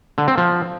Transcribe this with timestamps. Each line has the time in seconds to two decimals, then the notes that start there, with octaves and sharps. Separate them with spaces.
0.18 D3
0.28 C4
0.38 F3